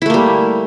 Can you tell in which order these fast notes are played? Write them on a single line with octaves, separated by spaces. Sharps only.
E4 A3 A#3 G3